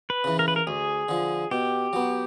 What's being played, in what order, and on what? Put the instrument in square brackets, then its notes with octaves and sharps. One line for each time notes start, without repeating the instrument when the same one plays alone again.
[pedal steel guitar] B4
[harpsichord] C#3 E3
[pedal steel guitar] A#4
B4
A#4
[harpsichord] D2 [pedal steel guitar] G#4
[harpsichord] D3 F3
[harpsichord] B2 [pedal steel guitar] G4
[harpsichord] F#3 B3